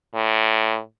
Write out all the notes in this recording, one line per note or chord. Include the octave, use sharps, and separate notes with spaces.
A2